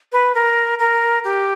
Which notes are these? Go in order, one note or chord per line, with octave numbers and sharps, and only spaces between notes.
B4
A#4
A#4
G4